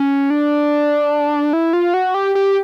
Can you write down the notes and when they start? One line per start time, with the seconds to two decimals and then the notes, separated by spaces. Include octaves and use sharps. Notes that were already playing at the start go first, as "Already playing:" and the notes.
Already playing: C#4
0.30 D4
1.53 E4
1.73 F4
1.94 F#4
2.14 G4
2.35 G4